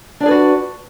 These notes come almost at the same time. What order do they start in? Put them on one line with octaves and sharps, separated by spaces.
D4 D5 G#4 B4 F#4